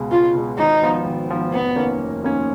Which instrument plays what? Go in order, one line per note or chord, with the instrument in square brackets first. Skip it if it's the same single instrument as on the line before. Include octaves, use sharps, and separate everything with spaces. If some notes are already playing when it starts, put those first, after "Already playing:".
Already playing: [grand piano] C#2 B2 G#3
[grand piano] C#2 [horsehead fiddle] F4
[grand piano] B2 G#3
[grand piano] G#1 [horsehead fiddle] D#4
[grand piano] G#2 F3 B3
G#1
G#2 F3 B3
[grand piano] F1 [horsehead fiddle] B3
[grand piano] D#2 D#3 A#3 C#4
F1
D#2 D#3 A#3 C#4